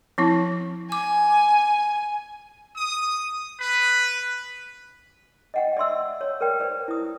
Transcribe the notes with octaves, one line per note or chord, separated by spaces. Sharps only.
F3 C4 E4
G#5 D6
D#6
B4
D#5 F#5 G5
D5 E5 C6 E6
C#5
A#4 B4 D5 G5
B4 C5 D5
E4 D#6